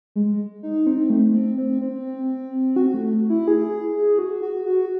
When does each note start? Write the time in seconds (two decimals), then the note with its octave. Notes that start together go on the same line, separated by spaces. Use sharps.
0.16 G#3
0.63 D#4
0.87 C4
1.10 A3
1.34 C4
1.58 C4
1.82 C4
2.76 F#4
2.94 A3
3.29 E4
3.48 G#4
4.19 F#4
4.42 F#4
4.66 F#4